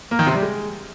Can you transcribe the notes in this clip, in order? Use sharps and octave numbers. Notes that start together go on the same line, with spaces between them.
A#3
D#3
C3
G3
G#3